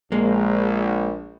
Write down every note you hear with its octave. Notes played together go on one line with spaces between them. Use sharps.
A#1 G#3 A#3